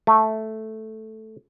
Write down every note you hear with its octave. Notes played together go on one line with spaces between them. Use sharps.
A3